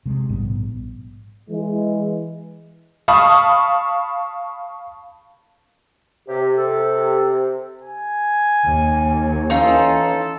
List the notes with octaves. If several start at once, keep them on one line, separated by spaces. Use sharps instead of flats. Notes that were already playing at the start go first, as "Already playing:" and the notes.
C3 G#3
A#1 G#2 G3 B3
E3 G#3
F5 A5 B5 C#6 D#6
C3 G4
A4
G#5
D#2
E3 C#4 D#4 F4 A4